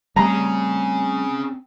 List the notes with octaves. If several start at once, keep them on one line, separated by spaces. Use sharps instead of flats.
G3 A3 C4 C#4 G#4 A#5